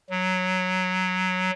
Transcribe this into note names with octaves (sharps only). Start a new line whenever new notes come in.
F#3